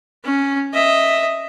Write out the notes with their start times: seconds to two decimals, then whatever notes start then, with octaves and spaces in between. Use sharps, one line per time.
0.24 C#4
0.73 D#5 E5